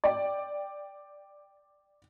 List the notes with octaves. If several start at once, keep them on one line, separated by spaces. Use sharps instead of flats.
D5 G5